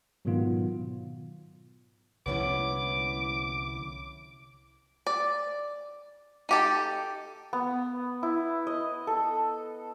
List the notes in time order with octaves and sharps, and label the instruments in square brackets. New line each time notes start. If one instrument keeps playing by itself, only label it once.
[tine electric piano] G#2 B2 D#3 F#3 B3 F4
[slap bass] C2 D3 F3 [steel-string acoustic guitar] B3 C#4 E4 [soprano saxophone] D6
[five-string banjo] D5
D#4 G4 A4
[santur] B3
E4
D#5
A4